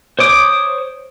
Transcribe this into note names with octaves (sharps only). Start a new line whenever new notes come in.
C5 C#5 D6 D#6